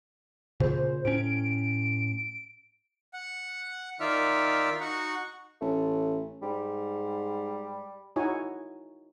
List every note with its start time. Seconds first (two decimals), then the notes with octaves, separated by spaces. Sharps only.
0.60 A#2 C#3 C5
1.05 A2 C#4 D7
3.14 F#5
4.00 D#3 D#4 F4 D5 E5 F6
4.81 D#4 F#4 F#5 C#6
5.61 A1 A3
6.42 G#2 G3
8.16 D#4 E4 F#4 C#5 G#5